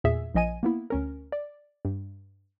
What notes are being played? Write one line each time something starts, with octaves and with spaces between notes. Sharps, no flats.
E2 A#2 G#4 E5
A#1 F3 D#5 G#5 D#7
A#3 B3 E4
D2 C#4 A#4
D5
G2